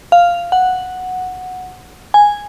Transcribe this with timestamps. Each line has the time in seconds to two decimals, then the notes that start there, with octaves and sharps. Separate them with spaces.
0.12 F5
0.52 F#5
2.14 G#5